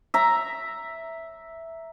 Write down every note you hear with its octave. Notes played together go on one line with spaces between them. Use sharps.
E5 A#5